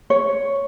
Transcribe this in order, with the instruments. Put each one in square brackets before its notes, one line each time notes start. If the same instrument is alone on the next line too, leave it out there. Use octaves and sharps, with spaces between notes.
[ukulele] C#5